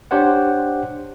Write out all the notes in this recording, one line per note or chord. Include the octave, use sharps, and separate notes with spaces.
D4 G4 C5 C#5 F#5